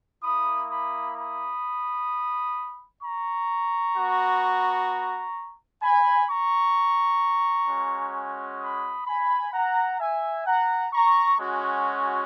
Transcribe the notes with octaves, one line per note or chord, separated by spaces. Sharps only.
A#3 E4 B5 D#6
B5 D#6
B5 D#6
A#5 C#6
B3 F#4
G#5 B5
A#5 C#6
G#3 C#4 F#4
B5 D#6
G#5 B5
F#5 A#5
E5 G#5
F#5 A#5
A#5 C#6
G#3 C#4 F#4